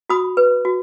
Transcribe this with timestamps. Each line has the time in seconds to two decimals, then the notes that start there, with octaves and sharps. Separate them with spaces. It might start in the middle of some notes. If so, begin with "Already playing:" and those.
0.09 F#4 B5 D#6
0.37 B4
0.65 F#4